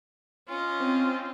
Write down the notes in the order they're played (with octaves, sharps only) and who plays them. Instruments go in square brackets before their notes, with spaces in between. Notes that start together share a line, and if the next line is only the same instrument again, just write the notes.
[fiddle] C#4 D#5 [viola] F4
[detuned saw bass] C4